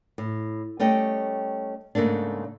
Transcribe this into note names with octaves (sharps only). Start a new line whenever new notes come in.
A2
G3 A3 C#4 D#5 G5
G#2 C#3 A3 A#3 D4